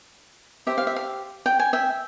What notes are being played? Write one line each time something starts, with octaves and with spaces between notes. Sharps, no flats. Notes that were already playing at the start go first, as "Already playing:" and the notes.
G4 C5 E5
F5
E5
F5
G5
G#5
E5 G5